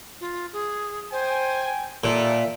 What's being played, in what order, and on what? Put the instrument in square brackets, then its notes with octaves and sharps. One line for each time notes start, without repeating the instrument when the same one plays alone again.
[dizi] F4
G#4
[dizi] C5 [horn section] G5 G#5
[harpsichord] A#2 [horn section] G3 D#4 A4 [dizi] E5